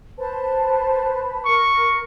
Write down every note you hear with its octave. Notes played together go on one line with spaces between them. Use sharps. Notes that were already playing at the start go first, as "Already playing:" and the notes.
B4 C5 A5
A#4 C#6